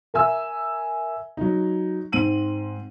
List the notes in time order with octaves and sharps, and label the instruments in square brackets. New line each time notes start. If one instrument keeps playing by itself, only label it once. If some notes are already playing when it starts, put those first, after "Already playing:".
[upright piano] A#4 E5 G#5 E6
F#3 D#4
G#2 C4 D#7 F#7